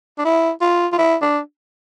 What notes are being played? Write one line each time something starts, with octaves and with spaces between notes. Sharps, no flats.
D4
E4
F4
F4
E4
D4